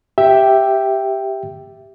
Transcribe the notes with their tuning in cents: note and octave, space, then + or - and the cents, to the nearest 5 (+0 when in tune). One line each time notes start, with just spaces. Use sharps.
G4 +0 E5 +0 G5 +0